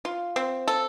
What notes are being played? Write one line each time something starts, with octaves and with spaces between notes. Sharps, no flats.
F4
C4
A4